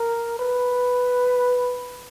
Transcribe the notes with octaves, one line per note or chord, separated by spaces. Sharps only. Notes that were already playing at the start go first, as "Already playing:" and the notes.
Already playing: A#4
B4